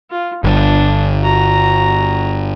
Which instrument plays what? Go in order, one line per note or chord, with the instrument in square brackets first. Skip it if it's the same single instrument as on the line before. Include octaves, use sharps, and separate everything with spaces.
[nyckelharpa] F4
[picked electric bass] G1 [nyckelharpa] D4
[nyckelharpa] F#4 A#5